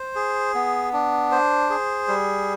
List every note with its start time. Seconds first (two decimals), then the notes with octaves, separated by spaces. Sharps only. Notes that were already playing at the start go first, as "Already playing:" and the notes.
Already playing: C5
0.16 G#4
0.55 B3
0.93 D4
1.31 C5
1.70 G#4
2.08 G3